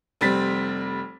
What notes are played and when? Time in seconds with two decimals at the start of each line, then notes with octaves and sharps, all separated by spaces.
0.21 F1 G3 C4 A6 B6